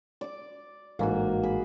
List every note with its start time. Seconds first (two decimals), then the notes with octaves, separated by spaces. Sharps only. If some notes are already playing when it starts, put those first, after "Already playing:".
0.21 D5 D6
0.99 A1 G#2 A#3 F#4
1.43 G#4 B5